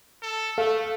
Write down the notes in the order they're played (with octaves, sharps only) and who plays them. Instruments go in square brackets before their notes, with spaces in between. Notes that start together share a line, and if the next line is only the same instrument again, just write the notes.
[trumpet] A4
[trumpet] A3 [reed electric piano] A4 F5